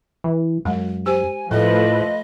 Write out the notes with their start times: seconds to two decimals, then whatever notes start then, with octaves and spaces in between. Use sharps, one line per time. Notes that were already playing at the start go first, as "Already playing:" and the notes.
0.24 E3
0.65 F#2 G#3
1.06 G4 C5 G#5
1.51 A2 F3 A3 A4 B4 D#5